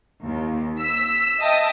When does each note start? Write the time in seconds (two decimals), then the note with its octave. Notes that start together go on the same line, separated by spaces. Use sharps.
0.24 D#2
0.80 E6 B6
1.40 D#5 E5 G5 A5 D#6